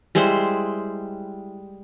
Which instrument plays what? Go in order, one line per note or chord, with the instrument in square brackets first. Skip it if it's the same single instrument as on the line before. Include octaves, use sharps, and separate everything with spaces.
[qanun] G3 G#3 E4 C5